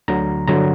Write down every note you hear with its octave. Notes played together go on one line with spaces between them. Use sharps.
D2 D3 F#3 A#5
G2 D3 F#3 A#5